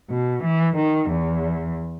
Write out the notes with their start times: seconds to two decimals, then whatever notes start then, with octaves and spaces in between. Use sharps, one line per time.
0.10 B2
0.44 E3
0.77 D#3
1.10 E2